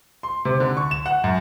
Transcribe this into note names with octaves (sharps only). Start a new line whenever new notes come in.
C6
C3
D3
C#6
E7
F#5
F#2